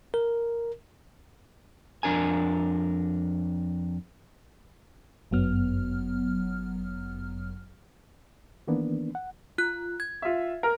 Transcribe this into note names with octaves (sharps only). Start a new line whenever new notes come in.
A#4
F2 D4 A#4 G#5
G1 F#2 F#3 B3 F6
D#3 E3 A#3 B3 D4
F#5
F4 F#6
G#6
F4 E5
A#4